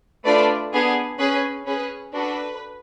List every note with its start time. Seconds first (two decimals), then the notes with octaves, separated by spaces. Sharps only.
0.24 A3 D4 F4 B4 D5
0.72 B3 D4 G#4
1.19 C#4 G#4 B4
1.66 C#4 G#4 B4
2.13 D4 F#4 A4 B4